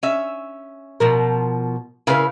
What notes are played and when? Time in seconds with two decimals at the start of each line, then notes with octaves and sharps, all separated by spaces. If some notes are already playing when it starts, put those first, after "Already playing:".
0.03 C#4 E5
1.00 B2 F3 A#4
2.07 C#3 E4 A#4 B4 F5